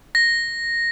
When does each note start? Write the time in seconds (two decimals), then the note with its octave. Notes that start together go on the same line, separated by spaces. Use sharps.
0.15 A#6